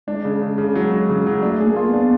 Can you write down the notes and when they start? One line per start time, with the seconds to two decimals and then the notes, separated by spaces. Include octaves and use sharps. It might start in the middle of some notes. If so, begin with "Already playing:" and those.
0.07 G#3 D4
0.25 C#3
0.41 C#3
0.58 C#3
0.76 F#3
0.92 F#3
1.09 C#3
1.27 F#3
1.42 A3 D4
1.56 A3 G#4
1.65 A#3
1.76 F4
1.88 B3
1.93 D4